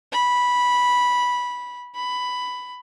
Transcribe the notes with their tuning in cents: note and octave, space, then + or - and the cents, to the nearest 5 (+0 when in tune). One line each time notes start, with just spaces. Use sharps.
B5 -10
B5 +10